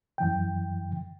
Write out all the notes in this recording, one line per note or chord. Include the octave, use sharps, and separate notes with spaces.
F#2 E3 G5